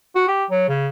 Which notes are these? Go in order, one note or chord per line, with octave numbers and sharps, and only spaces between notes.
F#4
G4
F#3
C#3